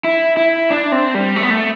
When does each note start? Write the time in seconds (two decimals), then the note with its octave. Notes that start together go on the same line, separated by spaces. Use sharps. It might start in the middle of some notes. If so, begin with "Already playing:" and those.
0.04 E4
0.37 E4
0.71 D4
0.92 C4
1.15 G3
1.36 A3
1.43 B3
1.50 A3